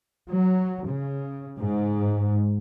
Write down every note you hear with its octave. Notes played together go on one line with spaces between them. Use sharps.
F#3
C#3
G#2